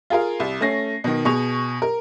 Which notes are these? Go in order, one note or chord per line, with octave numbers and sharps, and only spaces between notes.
F4 G#4 A#4 F5
C2
A3 C#4 A#6 C7
B2 D#3
B2 G#4 C#6 F7
A#4